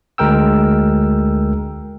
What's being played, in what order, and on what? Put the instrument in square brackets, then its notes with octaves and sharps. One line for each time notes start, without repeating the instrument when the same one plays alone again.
[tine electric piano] D2 G#3 A#4 G5 E6